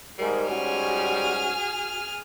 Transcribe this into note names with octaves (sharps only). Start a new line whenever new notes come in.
G#2 G3 A#4
G#2 C#4 F#4 G#4 F6